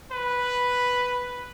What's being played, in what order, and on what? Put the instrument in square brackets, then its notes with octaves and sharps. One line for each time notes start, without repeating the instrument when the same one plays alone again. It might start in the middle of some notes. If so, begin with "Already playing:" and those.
[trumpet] B4